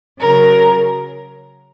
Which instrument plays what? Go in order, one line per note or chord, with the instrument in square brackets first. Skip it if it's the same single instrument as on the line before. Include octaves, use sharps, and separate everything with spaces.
[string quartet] C#3 F#3 A#4